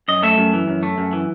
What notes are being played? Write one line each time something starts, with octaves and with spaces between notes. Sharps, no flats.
F#2 D#5
A3 E5
F#2
E3
F#2
A3
F#2
E3